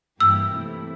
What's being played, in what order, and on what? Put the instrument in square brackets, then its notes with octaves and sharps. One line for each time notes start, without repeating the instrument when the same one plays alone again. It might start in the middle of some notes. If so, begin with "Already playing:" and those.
[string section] G2 E3 A#3 E4 G4 [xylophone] E6
[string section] C3 E3 A3 E4